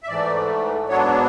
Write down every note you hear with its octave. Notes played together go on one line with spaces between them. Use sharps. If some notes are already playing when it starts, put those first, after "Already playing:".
E5
G#2 E3 A3 D5
G#2 F#3 B3 D4 C#5